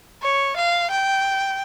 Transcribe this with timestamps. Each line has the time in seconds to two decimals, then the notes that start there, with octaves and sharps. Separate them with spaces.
0.22 C#5
0.56 F5
0.90 G5